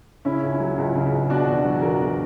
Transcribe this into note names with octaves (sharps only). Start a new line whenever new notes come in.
C#3 C#4 E4
C#2
F#3
C#2
C#3
C#2
B2 D4 F#4
E2
F#3
E2 F#4 A#4
B2